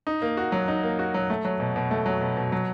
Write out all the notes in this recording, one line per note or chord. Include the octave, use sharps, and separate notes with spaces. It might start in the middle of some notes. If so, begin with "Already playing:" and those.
D#4
A#3
F#4
F#3
D#4
A#3
F#4
F#3
A3
F#3
B2
B2
A3
F#3
B2
B2
F#3